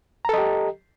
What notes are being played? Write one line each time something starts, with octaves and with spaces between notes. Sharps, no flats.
G4 A4 D#5 A#5